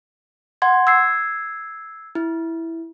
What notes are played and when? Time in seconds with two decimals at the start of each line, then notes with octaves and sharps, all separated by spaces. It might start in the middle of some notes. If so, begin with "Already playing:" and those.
0.62 F#5 C6 G#6
0.87 E6 G#6 C7
2.15 E4